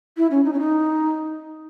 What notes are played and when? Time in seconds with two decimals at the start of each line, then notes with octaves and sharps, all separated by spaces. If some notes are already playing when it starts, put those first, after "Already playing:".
0.17 E4
0.31 C#4
0.45 D#4
0.53 C#4
0.59 D#4